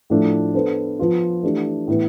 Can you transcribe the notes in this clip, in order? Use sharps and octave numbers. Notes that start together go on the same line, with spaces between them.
A2 F3 A3 D4
B3 D4 A4 C5
F3 B3 F4
E3 A3 D4 G4
A2 E3 B3